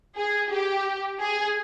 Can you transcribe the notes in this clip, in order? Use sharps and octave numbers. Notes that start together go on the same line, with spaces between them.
G#4
G4
G#4